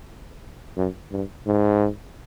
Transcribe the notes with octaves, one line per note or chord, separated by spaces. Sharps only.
F#2
G2
G#2